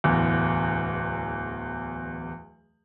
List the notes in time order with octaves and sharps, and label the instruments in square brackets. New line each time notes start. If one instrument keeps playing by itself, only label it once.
[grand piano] D1 E2